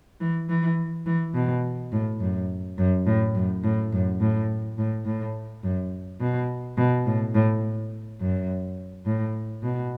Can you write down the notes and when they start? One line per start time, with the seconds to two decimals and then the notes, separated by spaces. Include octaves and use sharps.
0.20 E3
0.49 E3
1.06 E3
1.34 B2
1.92 A2
2.20 F#2
2.78 F#2
3.06 A2
3.35 F#2
3.64 A2
3.92 F#2
4.21 A2
4.78 A2
5.05 A2
5.63 F#2
6.20 B2
6.78 B2
7.06 A2
7.35 A2
8.20 F#2
9.06 A2
9.63 B2